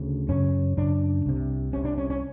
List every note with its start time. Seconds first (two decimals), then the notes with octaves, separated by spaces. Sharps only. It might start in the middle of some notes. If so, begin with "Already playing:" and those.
Already playing: D2 C#3
0.29 F#2 C#3 C#4
0.77 F#2 C#3 D4
1.26 C2 C3
1.73 C2 C3 C#4
1.85 D4
1.98 C#4
2.10 C#4